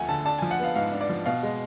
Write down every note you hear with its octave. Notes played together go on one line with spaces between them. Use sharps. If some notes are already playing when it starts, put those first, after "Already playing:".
Already playing: D2 F3 A3 F#5 G#5
D3 A5
D4 A5
F3 G#5
F#5
B3 F5
G#2 F5
D4
D5
F3
B2 F5
G#3